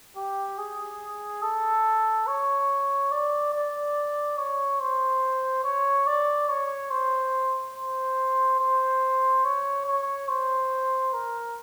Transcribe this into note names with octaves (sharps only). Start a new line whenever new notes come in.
G4
G#4
A4
C#5
D5
D5
C#5
C5
C#5
D5
C#5
C5
C5
C5
C#5
C#5
C5
A#4